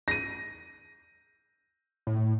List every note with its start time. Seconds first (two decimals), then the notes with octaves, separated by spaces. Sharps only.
0.08 A#6 D#7
2.07 A2